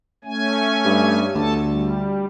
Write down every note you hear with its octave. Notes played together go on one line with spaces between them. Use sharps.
A3 C#4 G#5
G2
D2 A4 A5
G3